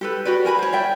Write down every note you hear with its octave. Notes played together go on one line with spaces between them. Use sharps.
G4 A4 B4
F#4 G4 B4 D5
A#4 G#5 A#5 B5
C5 C#5
D5 E5 G5